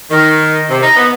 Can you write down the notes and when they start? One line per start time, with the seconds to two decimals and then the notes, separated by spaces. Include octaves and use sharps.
0.10 D#3
0.69 C3
0.82 D#4
0.97 B3